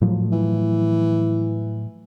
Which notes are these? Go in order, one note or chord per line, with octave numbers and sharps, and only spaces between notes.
A2 F3 F#3
E3